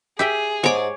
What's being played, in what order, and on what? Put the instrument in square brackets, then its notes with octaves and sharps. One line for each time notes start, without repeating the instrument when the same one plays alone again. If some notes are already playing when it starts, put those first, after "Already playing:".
[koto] G4 E5 G5 [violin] G#4
[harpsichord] G#2 [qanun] C#5 D6